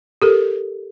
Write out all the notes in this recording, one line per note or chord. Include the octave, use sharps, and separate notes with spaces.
G4 A4 A#4